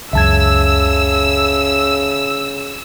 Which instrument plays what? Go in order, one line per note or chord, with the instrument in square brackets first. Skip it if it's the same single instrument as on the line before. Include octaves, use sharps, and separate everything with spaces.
[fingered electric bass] C#2 F#2 [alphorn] C#3 [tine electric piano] E5 A5 G#6 [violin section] E6